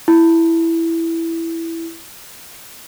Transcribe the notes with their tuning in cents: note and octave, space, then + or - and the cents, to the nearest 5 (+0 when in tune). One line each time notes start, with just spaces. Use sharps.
E4 +5